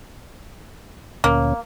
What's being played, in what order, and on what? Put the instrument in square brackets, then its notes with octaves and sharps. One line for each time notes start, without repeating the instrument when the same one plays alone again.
[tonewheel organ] D2 A#2 C#4 [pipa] A#3